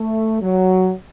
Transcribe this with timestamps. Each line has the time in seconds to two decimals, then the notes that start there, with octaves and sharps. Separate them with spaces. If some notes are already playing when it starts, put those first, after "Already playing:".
Already playing: A3
0.41 F#3